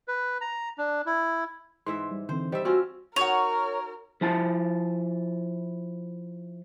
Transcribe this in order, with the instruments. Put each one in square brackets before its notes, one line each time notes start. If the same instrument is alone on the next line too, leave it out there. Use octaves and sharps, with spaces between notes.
[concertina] B4
A#5
D4
E4
[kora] G#2 E3 E5 [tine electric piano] C6
[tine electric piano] G3
[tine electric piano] D3 E3 C4 [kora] C5
[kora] G3 E5 [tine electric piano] G4 C5 D#5
[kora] C4 C#4 F4 [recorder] F#4 [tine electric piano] E6
[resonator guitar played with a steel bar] D#4 F#4 F#5 [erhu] A#4 [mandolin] C#5
[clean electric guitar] F3 E4 A5